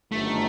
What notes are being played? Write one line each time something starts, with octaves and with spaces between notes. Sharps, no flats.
G1 F#2 D#3 A3